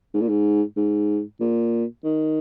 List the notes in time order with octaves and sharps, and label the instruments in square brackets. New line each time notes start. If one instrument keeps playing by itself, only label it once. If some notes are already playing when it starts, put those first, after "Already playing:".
[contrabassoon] G#2
A#2
G#2
G#2
A#2
D#3